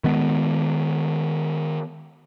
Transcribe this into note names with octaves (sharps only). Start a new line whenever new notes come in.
D#3 G#3 B3